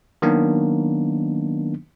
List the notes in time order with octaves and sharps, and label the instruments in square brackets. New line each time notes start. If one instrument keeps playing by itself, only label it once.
[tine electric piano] D#3 F#3 A#3 B3 D4 D#4